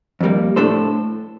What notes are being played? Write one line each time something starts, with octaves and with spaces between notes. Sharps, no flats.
F2 D#3 G3 A#3
A2 A3 D4 A4 C5